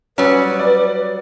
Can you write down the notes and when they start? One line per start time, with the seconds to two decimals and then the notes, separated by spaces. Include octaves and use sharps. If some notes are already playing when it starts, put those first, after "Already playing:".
0.18 F#3 G3 C#4 B4
0.59 D5